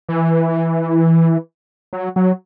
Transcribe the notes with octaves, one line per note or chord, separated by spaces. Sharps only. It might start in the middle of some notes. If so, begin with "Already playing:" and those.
E3
F#3
F#3